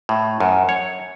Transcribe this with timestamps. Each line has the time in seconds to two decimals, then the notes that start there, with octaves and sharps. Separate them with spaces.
0.09 A2
0.40 F#2
0.69 C#5